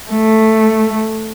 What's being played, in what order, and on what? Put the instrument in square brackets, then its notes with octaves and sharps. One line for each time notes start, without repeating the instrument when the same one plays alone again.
[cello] A3